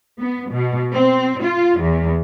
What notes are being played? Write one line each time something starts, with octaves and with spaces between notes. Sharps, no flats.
B3
B2
C4
F4
E2